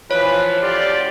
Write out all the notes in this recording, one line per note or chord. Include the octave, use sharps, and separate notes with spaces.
E3 F3 B4 C#5
D2 F4 G4 D5